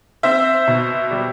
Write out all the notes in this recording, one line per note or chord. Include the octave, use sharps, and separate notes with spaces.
C4 C5 E5
B2
G3